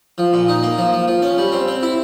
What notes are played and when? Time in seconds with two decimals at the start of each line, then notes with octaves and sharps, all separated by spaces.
0.18 F3
0.33 A#2
0.48 D#4
0.63 A#3
0.78 F3
0.93 F3
1.08 F3
1.22 C#4
1.38 G3
1.52 C4
1.68 C4
1.83 E4